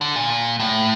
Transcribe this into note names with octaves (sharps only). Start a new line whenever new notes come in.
D3
A#2
A2